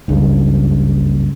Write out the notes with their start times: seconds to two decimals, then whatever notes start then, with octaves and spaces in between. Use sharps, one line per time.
0.08 F#1 C#2 G2 C#3